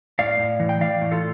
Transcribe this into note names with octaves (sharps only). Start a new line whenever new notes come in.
A2 D5 F5
A2
E3
G5
E3 D5 F5
A2
F4 A4